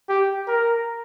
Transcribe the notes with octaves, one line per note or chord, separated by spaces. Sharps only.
G4
A#4